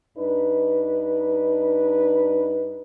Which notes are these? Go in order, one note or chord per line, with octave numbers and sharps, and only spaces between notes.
G2 D4 D#4 B4